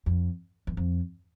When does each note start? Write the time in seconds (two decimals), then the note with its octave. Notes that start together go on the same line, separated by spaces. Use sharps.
0.06 F2
0.67 E2
0.77 F2